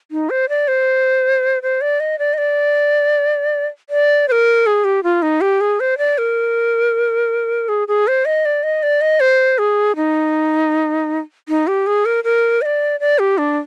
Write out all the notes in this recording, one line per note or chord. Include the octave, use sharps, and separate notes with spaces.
D#4
C5
D5
C5
C5
D5
D#5
D5
D#5
D5
D5
C5
A#4
G#4
G4
F4
D#4
G4
G#4
C5
D5
A#4
G#4
G#4
C5
D#5
D5
D#5
D5
D#5
C5
G#4
D#4
D#4
G4
G#4
A#4
A#4
D#5
D5
D5
G4
D4